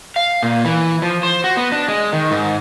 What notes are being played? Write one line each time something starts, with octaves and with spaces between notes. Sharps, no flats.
F5
A#2
E3
F3
C5
F#4
B3
D4
G#3
D#3
G#2